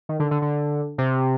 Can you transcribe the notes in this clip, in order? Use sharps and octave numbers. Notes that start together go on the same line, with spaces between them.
D#3
D3
D3
D3
C3